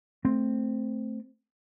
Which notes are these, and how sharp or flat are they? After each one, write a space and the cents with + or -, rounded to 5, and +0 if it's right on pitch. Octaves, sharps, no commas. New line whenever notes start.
A3 +0 C4 +0